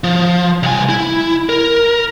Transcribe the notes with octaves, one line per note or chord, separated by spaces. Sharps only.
F3
C2 G#5
E4
A#4